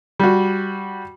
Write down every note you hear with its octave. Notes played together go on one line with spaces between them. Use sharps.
G3 F#4